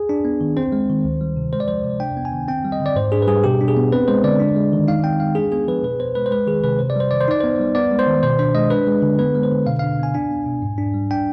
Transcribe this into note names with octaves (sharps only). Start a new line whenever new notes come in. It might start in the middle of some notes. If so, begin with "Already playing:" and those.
Already playing: G#4
D4
B3
D#3
C4 C5
G#3
D#3
D2
G3
C3
G#3 C5
D5
F3 C5
C3
D4 G5
B3
G#5
D#3
C4 G5
G3
D#5
D3
D5
G#2 C5
D4 G#4
B4
G3 G#4
B2 G4
D4
G#4
B3
C4 B4
G#3 C5
D3 D5
D4
G#3
D#3
D#4 F5
C4 G5
G#3 F5
D4 G#4
B3 G#4
F3 B4
B2 B4
B3 C5
G#3 B4
C5
G#3 B4
D#3 G#4
C3 B4
C3 C5
D5
G3 C5
D#3 D5
C5
D#4 D5
B3 C5
G3
B3 D5
G#3
C5
D#3
B2 C5
D4 C5
G#3 D#5
D4 B4
G#3
D3
B3 B4
G#3
C5
D3
B2 F5
D4 F5
B3 G#5
D4 G#5
B3
B2
G#2
D4
G3
D4 G5